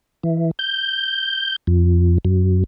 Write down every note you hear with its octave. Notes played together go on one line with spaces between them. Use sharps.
E3
G6
F2
F#2